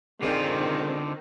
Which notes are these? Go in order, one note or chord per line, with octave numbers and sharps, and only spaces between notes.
D3 D#3 C4 F4 G#4 C5 D5